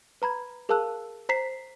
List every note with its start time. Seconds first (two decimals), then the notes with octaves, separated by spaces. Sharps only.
0.22 B4 A#5 B5 G#6
0.69 G#4 A#4 F5 A5 E6 F#6
1.29 C5 A#5 B6 C7